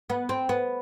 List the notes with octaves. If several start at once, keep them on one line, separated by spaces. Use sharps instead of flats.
B3
C4
B3